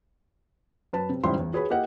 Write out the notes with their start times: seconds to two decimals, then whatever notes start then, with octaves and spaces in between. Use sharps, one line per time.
0.93 F#2 B4 A5
1.09 C3
1.24 A1 G#2 C#3 G3 E4 C6
1.35 A1 E2
1.53 F#4 G#4 B4 C#5 B5
1.70 A#3 E4 G4 A#4 D#5 F#5